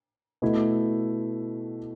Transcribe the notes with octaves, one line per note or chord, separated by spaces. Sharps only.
B2 A3 E4